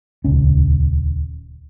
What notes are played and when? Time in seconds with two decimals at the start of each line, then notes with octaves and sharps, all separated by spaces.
0.24 D#1 C#2 C#4